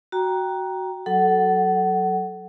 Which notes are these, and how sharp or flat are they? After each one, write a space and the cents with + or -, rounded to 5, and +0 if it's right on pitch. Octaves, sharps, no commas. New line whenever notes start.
F#4 +5 G5 +0 A#5 +10
F#3 +0 A4 +0 F#5 +25